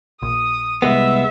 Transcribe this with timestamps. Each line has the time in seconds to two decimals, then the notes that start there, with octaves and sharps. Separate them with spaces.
0.22 A#1 D#6
0.82 C2 G#3 B3 E5